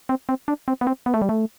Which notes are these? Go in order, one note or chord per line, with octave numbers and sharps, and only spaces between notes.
C4
C4
D4
C4
B3
C4
B3
A3
G3
A3